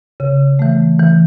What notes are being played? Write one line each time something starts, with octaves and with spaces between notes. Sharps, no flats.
C#3
E3 A3
E3